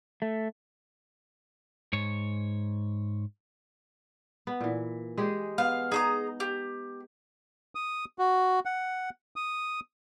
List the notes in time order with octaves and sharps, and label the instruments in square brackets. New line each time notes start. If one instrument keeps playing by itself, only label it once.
[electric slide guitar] A3
[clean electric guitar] G#2 C#5
[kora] B3
A#2 E3
G#3 G4 G#4
[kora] B3 [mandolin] F5
[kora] D#4 [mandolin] G#4 A#5 D#6
[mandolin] G4
[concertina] D#6
F#4
F#5
D#6